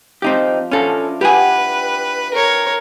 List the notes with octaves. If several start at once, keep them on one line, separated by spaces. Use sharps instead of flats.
F3 C4 D#4 G4
C#4 D4 E4 F4 A4
G3 G4 B4 F#5 G#5
A#4 C#5